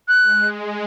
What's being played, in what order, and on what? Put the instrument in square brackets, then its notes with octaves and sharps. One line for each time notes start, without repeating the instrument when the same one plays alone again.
[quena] F#6
[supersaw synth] G#3